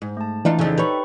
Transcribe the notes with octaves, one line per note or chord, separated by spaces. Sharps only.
G#2
A3 A5
E3 D4 D#4 F4
F2 C#3 D#4 A4 D#5
G4 B4 C#5 B5 C#6